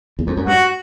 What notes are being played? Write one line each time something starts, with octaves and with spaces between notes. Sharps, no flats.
E2
F2
F#2
G2 F#4